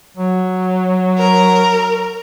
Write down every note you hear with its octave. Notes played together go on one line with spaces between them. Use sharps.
F#3
A#4